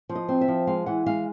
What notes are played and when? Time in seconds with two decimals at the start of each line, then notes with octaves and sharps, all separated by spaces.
0.09 F3
0.15 D#5
0.29 C4
0.41 E5
0.48 F3
0.67 G#3 F5
0.86 E3 F#5
1.06 G#3 F5